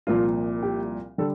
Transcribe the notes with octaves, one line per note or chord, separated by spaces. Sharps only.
C2 A#2 F3 F4
G4
D3 G3 A4